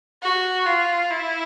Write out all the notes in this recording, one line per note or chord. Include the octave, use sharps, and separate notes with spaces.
F#4
F4
E4